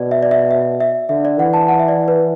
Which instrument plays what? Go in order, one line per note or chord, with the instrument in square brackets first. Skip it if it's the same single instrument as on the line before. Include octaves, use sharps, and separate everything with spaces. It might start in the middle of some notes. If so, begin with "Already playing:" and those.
Already playing: [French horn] B2 [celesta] D5
[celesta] E5
D5
E5
E5
E5
[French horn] D3 [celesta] E5
[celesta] D5
[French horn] E3 [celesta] F#5
[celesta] A5
F#5
E5
D5
B4